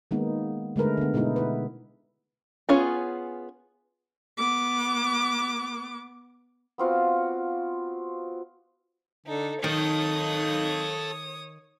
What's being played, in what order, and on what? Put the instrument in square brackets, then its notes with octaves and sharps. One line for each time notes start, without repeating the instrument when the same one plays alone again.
[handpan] D#3 G#3 A#3 B3 D#4
D3 G#3 A3 A#4 B4
D3 B3
B2 G#3 B3 D#4 E4
E4 B4
[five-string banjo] B3 C#4 F4 G#4 C#5
[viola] B3 D6
[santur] B3 C4 F4 F#4
[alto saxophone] D3 [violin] D#4 A4
[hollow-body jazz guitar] D#3 [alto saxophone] D#4 [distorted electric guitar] A4 F5 [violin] C#5 D#6